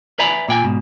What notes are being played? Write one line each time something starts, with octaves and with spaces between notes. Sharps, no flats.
B4 D5 E5 G#5 A#5 B5
A#2 G5 G#5
G#2 B2